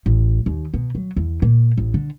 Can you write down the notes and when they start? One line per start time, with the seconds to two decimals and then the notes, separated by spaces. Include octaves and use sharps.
0.06 A1
0.46 D#2
0.74 B2
0.95 F#3
1.16 E2
1.42 A#2
1.77 A1
1.94 D3